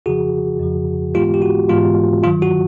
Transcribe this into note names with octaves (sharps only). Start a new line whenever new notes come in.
F2 C#3 F3 F#4 G#4
F2 C#3 F3
G#2 E3 G#3 B3 F4 G4
G4
F#4
G#2 E3 G#3 B3 F4
G2 D#3 F#3 F4
F#4